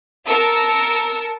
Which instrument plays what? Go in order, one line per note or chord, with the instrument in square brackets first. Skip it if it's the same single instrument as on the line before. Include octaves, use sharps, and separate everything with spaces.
[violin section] A#4 A5 E6 C#7